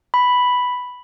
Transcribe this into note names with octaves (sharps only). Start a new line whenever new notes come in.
B5